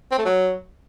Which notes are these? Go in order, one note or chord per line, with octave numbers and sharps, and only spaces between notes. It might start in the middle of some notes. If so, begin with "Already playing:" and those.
C4
A3
F#3